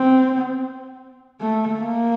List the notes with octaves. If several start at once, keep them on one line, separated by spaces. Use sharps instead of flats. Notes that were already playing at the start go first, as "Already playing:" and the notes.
Already playing: C4
A3
A#3